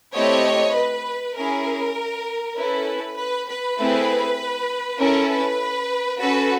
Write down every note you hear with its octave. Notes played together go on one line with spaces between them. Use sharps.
A3 C4 E4 G4 C#5 D#5
B4
C#4 E4 G#4 A#4
C#4 E4 A4 B4
B4
B4
A3 C4 E4 G#4
C#4 E4 A4 A#4
B4
C#4 F#4 A4 B4